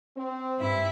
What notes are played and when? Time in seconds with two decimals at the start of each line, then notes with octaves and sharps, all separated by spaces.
0.17 C4
0.58 G2 E4 E5